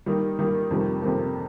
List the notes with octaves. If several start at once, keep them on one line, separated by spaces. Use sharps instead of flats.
D#3 G3 A#3 D#4
D#3 G3 A#3 D#4
F2 C3 D#3 G3 A#3
F2 C3 D#3 G3 A#3